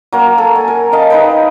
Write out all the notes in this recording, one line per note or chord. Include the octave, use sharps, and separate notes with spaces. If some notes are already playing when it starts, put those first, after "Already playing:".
F#3 A#3
A4
G#5
A#4
A#4 D#5 F5 A5
D#4 B4 G5